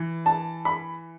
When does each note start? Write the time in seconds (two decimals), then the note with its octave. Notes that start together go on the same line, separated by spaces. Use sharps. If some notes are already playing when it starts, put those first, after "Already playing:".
Already playing: E3
0.26 A5
0.65 B5